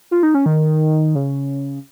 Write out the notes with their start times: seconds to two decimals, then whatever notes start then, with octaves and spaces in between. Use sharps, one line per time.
0.11 F4
0.23 D#4
0.34 C#4
0.46 D#3
1.15 C#3